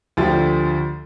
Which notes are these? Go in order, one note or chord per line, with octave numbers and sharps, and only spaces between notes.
D2 D3 F3 G4 A6